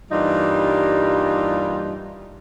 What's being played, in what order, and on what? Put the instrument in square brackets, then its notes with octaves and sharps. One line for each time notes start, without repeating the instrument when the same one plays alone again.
[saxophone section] G2 E3 G3 A#3 D#4 F4